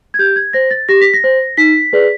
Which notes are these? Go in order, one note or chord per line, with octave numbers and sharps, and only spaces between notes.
G#6
G4 G6
G#6
C5 A#6
A6
G4 A#6
B6
A#6
C5
D#4 B6
G#4 B4 D5